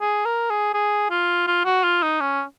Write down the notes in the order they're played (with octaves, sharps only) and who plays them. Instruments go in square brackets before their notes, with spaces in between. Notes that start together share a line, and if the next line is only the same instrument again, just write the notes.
[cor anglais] G#4
A#4
G#4
G#4
F4
F4
F#4
F4
D#4
C#4